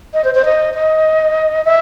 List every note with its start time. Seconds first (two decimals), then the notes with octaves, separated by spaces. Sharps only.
0.14 D#5
0.24 C5
0.35 C5
0.45 D#5
0.74 D#5
1.65 E5